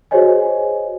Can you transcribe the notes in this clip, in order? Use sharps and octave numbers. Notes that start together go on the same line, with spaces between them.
F#4 G#4 C5 C#5 D#5 G#5